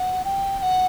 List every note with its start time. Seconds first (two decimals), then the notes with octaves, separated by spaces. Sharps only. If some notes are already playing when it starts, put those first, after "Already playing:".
Already playing: F#5
0.25 G5
0.59 G5
0.62 F#5